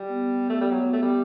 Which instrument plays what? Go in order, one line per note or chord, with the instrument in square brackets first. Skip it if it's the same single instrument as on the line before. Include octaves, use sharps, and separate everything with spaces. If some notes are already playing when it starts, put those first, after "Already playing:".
Already playing: [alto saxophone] G3
[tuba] B3
[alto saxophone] A3
G3
F#3
A3
G3